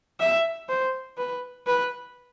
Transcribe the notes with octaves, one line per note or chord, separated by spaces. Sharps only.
E5
C5
B4
B4